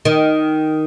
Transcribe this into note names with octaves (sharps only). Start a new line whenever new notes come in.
D#3